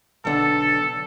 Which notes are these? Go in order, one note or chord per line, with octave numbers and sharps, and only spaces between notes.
B1 D3 A4